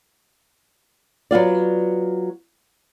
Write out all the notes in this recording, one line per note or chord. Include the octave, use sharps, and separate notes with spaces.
F#3 B3 F4 D5